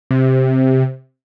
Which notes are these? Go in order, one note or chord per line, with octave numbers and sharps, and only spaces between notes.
C3